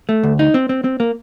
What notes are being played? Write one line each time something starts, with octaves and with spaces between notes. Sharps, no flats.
A3
D2
D#4
C4
C4
C4
A#3